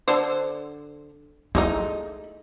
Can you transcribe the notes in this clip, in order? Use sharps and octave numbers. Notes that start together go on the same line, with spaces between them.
D3 A4 C5
G#3 A3 D#4 E4